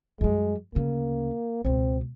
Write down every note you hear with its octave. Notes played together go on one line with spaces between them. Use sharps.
F#2 G3 G#3
D2 C#3 A#3
C#2 B2 C4